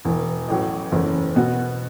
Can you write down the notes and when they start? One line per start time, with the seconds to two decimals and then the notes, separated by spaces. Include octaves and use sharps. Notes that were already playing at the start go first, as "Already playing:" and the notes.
0.05 E1 E2 E3
0.48 A1 A2 F#3
0.92 F#1 E2 E3 A3 C#4
1.36 B2 B3 F#4